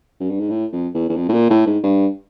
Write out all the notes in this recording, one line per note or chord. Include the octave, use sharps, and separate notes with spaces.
F#2
G2
G#2
A2
F2
E2
E2
F2
A2
A#2
A2
G#2
G2